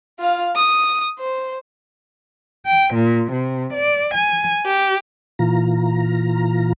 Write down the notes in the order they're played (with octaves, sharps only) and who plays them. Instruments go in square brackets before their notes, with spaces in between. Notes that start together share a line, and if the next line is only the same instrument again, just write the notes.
[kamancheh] F4 F5
D#6
C5
[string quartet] G5
A#2
C3
D5
G#5
G4
[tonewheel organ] A#2 E3 F4 A#5